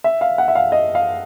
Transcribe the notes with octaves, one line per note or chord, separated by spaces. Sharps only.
E5
F5
F#5
E5
F5
D#5
F5